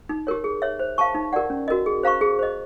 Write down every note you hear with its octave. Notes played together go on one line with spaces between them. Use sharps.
D#4
G4 A#4 C#5
G#4
C#5 E5
C5
F5 A5 C#6
D#4
G4 A#4 D5 F#5
C#4
F#4 A#4 D#5
G#4
C5 F5 A#5 C#6
G#4
C5 D#5